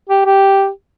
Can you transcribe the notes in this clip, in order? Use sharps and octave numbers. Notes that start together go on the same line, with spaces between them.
G4
G4